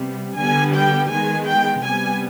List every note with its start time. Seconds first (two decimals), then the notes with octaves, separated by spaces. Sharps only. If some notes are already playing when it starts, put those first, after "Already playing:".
Already playing: C3 G3 B3
0.38 D3 G3 B3 G#5
0.75 G5
1.11 D#3 G#3 B3 G#5
1.47 G5
1.84 C3 G3 B3 G#5